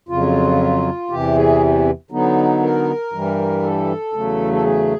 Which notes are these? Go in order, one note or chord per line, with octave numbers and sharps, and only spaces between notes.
F2 C#3 F#3 F4
E2 C3 E3 G4
G#4
D3 F#3 B3 D#4
A#4
G2 E3 G3
A4
E2 C#3 F#3 A3
A4
G#4